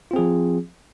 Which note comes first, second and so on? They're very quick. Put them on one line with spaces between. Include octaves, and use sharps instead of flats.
F4 C4 G#4 F3